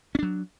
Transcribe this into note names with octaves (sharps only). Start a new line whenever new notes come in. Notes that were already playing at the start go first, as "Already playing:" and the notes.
F#3 C#4 D4